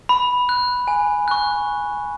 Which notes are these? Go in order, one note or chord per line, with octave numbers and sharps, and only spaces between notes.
B5
F#6
G#5
C#6 F#6